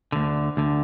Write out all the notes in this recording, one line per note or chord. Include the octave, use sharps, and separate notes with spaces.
D2 D3
D2 D3